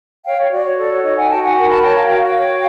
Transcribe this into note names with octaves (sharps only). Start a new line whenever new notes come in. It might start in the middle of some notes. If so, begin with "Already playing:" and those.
C#5 F5 G5
C#5
F#4 D5
C#5
A4 D5
C#5
D#4 C#5 D#5
F#5 G#5
F#4 G5 A5
F#5 G#5
A#4 F#5 G#5
A5 B5
C#5 G5 A5
F5 G5
F#4 F5 G5
F5 G5
C#5